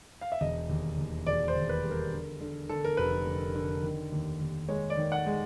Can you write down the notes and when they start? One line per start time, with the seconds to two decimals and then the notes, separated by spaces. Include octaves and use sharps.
0.21 F5
0.32 E5
0.41 E1 D#5
0.69 D#2
0.98 D#2
1.26 E1 D5
1.48 C5
1.56 D#2
1.69 B4
1.84 G3
1.91 A#4
2.13 D3
2.41 D3
2.69 D3 A4
2.84 A#4
2.97 F1 B4
3.26 D3
3.55 D3
3.83 D#3
4.12 D#2
4.41 D#2
4.69 G#3 C#5
4.90 D5
4.97 D#3
5.12 F#5
5.27 G#3